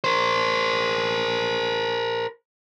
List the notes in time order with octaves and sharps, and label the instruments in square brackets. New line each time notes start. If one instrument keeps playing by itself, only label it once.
[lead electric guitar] A#4 C5